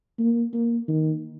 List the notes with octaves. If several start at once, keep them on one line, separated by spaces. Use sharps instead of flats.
A#3
A#3
D#3